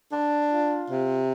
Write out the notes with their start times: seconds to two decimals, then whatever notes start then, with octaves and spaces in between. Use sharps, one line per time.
0.13 D4
0.50 F4
0.89 C3